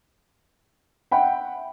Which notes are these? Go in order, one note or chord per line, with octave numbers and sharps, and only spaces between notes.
E5 F#5 G5 B5